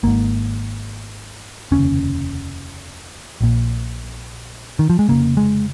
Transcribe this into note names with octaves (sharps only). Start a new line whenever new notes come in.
G#1 G#2 A#3
F1 D#2 C#3 C#4
A#1 A#2
D#3
F3
G#3
F1 F2 C#3 A#3
G#3